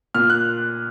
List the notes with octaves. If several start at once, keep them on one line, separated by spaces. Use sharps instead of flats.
A#2 F6
F#6